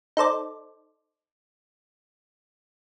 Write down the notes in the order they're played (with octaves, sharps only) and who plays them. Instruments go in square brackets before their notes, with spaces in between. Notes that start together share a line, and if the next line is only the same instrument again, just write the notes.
[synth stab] D#4 A4 C5 D5